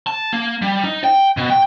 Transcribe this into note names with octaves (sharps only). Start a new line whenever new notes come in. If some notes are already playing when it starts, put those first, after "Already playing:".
A5
A#3
G3
D#4
G5
B2
G5